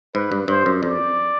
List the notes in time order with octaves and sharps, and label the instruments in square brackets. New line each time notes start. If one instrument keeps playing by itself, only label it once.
[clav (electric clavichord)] G#2 [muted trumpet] B4
[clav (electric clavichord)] G2
[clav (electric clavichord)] G2 [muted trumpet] C5
[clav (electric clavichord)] F#2
[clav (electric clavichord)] F2 [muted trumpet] D5